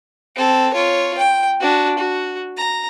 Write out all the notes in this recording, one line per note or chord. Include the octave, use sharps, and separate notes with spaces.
C4 A4
F4 C#5
G5
D4 F#4
F#4
A#5